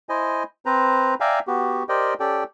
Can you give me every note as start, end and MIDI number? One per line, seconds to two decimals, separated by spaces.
0.09 0.43 64
0.09 0.43 72
0.09 0.43 75
0.09 0.43 80
0.66 1.14 60
0.66 1.14 71
0.66 1.14 72
0.66 1.14 82
1.20 1.39 74
1.20 1.39 76
1.20 1.39 77
1.20 1.39 79
1.20 1.39 80
1.20 1.39 82
1.47 1.83 59
1.47 1.83 66
1.47 1.83 67
1.89 2.14 67
1.89 2.14 70
1.89 2.14 72
1.89 2.14 74
1.89 2.14 75
1.89 2.14 79
2.20 2.44 61
2.20 2.44 67
2.20 2.44 69
2.20 2.44 74
2.20 2.44 79